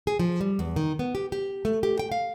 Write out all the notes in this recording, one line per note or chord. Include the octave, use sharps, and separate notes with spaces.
G#4
F3
G3
E2
D#3
B3
G4
G4
A3
G4
G5
F5